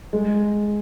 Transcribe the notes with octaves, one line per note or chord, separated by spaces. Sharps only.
G#3